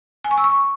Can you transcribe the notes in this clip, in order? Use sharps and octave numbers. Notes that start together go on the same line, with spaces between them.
G#5
C#6
E6
C#6